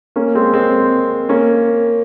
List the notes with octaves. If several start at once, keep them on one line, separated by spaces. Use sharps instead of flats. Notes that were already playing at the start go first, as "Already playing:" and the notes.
A#3 C#4
G#3 C4
G#3 C4
A#3 C#4